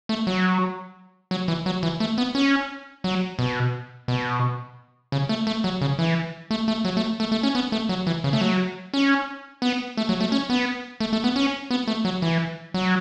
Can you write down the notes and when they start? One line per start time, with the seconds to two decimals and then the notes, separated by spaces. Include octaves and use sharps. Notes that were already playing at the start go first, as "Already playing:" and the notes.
0.09 A3
0.27 F#3
1.31 F#3
1.48 E3
1.66 F#3
1.83 E3
2.00 A3
2.18 B3
2.35 C#4
3.04 F#3
3.39 B2
4.08 B2
5.12 C#3
5.29 A3
5.47 A3
5.64 F#3
5.81 C#3
5.99 E3
6.51 A3
6.68 A3
6.85 F#3
6.97 A3
7.20 A3
7.32 A3
7.43 C#4
7.55 B3
7.72 A3
7.89 F#3
8.07 E3
8.24 C#3
8.33 A3
8.41 F#3
8.94 C#4
9.62 B3
9.97 A3
10.09 F#3
10.21 A3
10.32 C#4
10.50 B3
11.00 A3
11.13 A3
11.24 B3
11.36 C#4
11.71 B3
11.88 A3
12.05 F#3
12.22 E3
12.74 F#3